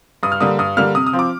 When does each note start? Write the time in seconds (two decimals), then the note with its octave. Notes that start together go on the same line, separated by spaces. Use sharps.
0.23 G2 D#6
0.32 F6
0.41 D3 G3 A#3 D#6
0.59 G2 D#6
0.77 D3 G3 A#3 F6
0.95 C3 D#6
1.07 D#6
1.13 F3 C4
1.19 D6